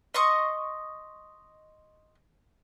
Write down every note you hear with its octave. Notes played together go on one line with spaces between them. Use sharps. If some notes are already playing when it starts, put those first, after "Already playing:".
D#5 C6 C#6 D#6